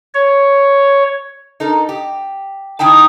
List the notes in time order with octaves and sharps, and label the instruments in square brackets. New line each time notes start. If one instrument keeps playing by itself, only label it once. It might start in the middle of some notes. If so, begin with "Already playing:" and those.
[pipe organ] C#5
[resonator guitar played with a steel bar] D#4 A4 A#4
G4
D#3 D#4 E4 G5 A5